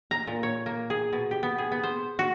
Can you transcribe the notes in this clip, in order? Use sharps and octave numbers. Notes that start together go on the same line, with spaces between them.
A#5
A#2
C#5
A#3
G#4
B2
G4
B3
G#4
B3
C5
F#4